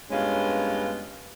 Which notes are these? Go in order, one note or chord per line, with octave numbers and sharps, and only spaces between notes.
G2 G#3 A#3 B3 C#4 F4